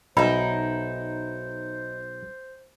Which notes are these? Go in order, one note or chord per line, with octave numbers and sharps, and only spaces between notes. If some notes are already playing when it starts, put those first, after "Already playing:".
B1 D#4 E4 C5 B5